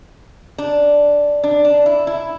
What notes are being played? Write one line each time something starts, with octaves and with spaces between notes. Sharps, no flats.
D4
D4
D4
E4
E4